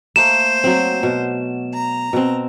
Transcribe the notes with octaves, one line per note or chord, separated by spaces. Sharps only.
A3 A#3 C5 E7
F#3 C4
B2
A#5
B2 C4